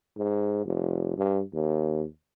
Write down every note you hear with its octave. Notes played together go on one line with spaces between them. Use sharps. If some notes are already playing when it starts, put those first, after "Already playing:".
G#2
F1
G2
D#2